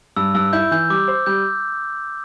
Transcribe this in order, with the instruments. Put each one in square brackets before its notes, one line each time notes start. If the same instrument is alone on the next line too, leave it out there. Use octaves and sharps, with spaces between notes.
[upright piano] G2 [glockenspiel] E6
[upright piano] G2 [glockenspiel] E6
[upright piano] E4 [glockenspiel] G6
[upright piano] E3 [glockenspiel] G6
[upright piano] G3 [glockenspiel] D6
[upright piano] C5
[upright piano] G3 [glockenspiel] G6